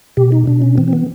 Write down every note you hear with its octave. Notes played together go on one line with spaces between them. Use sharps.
B2 G4
D#4
B2 D4
C#4
E3 C4
C4
B3